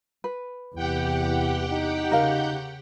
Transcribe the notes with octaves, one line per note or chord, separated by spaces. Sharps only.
B4
E2 C3 E3 G4 F#5 G5
D#4
C#3 A#4 F5